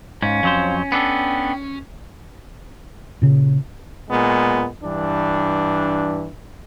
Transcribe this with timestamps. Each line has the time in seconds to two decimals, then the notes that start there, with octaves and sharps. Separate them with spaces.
0.22 G#2 C#4 F5
0.43 F2 F#3 C5
0.92 B3 D4 A4 G5
3.22 A#2 C#3
4.10 A#2 G#3 B3
4.83 G2 E3 D4